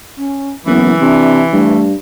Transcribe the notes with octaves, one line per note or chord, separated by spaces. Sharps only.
C#4
F#1 E3 B3
C3 D4
G2 A3